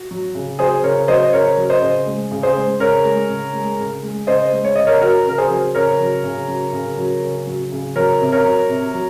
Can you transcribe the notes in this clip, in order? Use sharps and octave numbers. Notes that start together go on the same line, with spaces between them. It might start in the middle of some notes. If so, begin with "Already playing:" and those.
Already playing: F#4
F#3
C#3
F#3 G#4 C5
C#3 A#4 C#5
F#3 C5 D#5
C#3 A#4 C#5
F#3
C5 D#5
C#3
G#3
C#3
G#4 C5
G#3
C#3 A#4 C#5
G#3
C#3
G#3
C#3
G#3
C#3 C5 D#5
G#3
C#5
C#3 D#5
A#4 C#5
F#3 F#4 A#4
C#3 A#4
G#4 C5
F#3
C#3 A#4 C#5
F#3
C#3
F#3
C#3
F#3
C#3
F#3
C#3
F#3 A#4 C#5
C3
A#4 C#5
F#3
C3
F#3